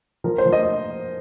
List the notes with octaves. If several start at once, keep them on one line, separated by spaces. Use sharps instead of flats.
F3 A#4
C5
F3
D#5